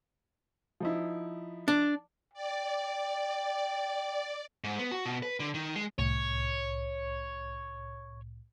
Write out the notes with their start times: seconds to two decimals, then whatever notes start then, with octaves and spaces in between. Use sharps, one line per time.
0.80 F3 D#4 E4
1.68 D4
2.33 D5 G5
4.64 G#2
4.79 B3
4.92 F#4
5.06 B2
5.23 B4
5.40 D3
5.54 D#3
5.76 G#3
5.98 C2 A2 C#5